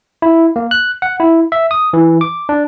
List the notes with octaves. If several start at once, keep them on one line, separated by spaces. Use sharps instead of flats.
E4
A#3
F#6
F#5
E4
E5
D#6
E3
D6
D4